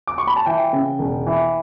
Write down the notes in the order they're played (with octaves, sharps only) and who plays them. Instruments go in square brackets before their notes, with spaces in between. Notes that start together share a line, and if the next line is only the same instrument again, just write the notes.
[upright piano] D6
C#6
B5
A5
E3 G5
C#3
E1
E3